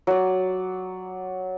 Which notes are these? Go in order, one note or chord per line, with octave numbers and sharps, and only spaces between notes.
F#3 D5